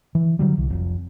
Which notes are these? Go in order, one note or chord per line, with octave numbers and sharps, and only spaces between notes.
E3
D3 F#3 G3
C2
F1